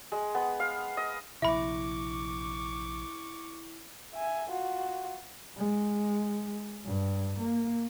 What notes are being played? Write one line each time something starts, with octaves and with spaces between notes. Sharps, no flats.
G#3
B3
F5
D#5
A#1 C3 E4 E5 B5 C#6 D6
E5 G#5
F4 F#4
G#3
G2
A#3